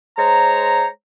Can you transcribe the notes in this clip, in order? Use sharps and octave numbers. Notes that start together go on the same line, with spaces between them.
G#3 C5 C#5 A#5